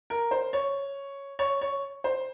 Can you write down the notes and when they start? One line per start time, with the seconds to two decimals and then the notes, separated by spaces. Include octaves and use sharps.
0.10 A#4
0.31 C5
0.53 C#5
1.39 C#5
1.61 C#5
2.04 C5